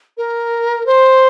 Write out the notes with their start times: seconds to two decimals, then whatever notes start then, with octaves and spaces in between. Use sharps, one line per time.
0.17 A#4
0.86 C5